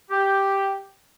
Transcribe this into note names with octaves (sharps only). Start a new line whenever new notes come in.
G4